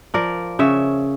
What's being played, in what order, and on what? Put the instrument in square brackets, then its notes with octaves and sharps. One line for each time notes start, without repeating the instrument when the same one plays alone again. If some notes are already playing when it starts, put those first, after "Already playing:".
[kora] F3 A#4 D5
C#3 C#5 E5